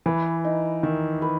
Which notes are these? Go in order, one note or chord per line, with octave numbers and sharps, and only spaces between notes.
E3 B4
D#4
D#3 E5
B4